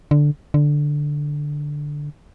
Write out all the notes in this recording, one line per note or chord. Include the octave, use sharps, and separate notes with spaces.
D3
D3